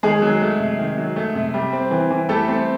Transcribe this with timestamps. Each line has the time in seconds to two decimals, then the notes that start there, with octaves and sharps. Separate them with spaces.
0.03 D#3 G#3 G#4
0.22 F#3
0.41 A3
0.59 C3
0.79 D#3
0.98 F#3
1.16 A3
1.35 C3
1.54 G3
1.73 C4
1.91 E3
2.10 E3
2.29 G3 A3 A4
2.48 C4